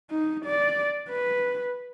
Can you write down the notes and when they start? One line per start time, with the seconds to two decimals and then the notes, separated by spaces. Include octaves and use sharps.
0.11 D#4
0.46 D5
1.09 B4